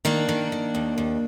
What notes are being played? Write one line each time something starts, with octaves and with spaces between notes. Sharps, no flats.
D#3 A#3 D4
D#3
D#3
D#2
D#2